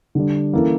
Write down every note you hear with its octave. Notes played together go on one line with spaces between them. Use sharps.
D3 G3 D4
E3 A#3 C#4 E4 A4